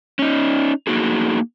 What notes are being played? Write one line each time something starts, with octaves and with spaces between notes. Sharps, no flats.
C#4 D#4
A#3 D#4 F#4 G#4